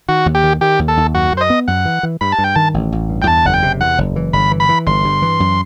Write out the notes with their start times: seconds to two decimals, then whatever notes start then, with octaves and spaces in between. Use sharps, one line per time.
0.08 D#3 F#4
0.26 D#2
0.35 G4
0.43 D#3
0.61 D#3 G4
0.79 D#2
0.88 A4
0.97 D#2
1.14 F#2 F#4
1.32 F#2 C5
1.41 D#5
1.50 B3
1.68 F#2 F#5
1.85 E3
2.03 E3
2.21 G2 B5
2.32 A5
2.38 G2
2.44 G5
2.55 D#3 A5
2.74 A1
2.92 A1
3.09 G2
3.22 G5
3.27 E2 A5
3.45 F#1 F#5
3.54 G5
3.63 C3
3.81 E2 F#5
3.98 F#1
4.16 E3
4.33 G1 B5
4.51 E3
4.60 B5
4.69 E3
4.87 G1 C6
5.04 G2
5.22 E3
5.40 F#2